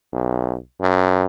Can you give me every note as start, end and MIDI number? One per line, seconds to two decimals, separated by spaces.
0.13 0.56 35
0.82 1.24 42